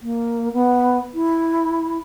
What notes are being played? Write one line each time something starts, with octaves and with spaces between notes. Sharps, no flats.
A#3
B3
E4